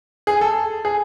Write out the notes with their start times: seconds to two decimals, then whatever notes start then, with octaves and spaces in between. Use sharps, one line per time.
0.27 G#4
0.41 A4
0.85 G#4